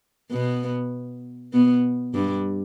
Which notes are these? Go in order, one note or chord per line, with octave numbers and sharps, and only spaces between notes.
B2 B3
B2 B3
G2 G3